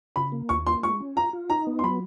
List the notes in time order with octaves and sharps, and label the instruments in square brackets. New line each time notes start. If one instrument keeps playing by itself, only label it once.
[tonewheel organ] C#3 [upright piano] B5
[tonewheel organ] A#3
[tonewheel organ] D#2 [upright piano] C#6
[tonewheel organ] A#3 [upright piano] C6
[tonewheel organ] G#3 [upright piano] C#6
[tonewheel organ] C#4
[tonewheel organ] F4 [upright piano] A#5
[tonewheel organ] F4
[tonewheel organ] D#4 [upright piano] A#5
[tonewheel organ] B3
[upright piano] C6
[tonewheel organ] F#3 [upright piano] B5